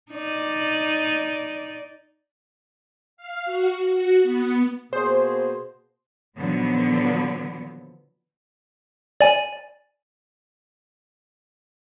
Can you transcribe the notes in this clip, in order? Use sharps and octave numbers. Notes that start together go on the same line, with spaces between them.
D#4 D5
F5
F#4
F#4
B3
B2 A#3 G#4 C5
A#2 D3 D#3 F3 F#3 B3
D5 G#5